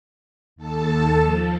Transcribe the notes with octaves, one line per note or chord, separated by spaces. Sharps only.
D#2 A4 A5
F3